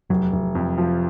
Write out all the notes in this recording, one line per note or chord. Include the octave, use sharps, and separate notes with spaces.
F1 F#3
F1
F2
F3